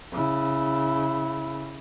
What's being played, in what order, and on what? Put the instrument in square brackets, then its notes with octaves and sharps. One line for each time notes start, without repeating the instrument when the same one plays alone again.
[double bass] C#3 E4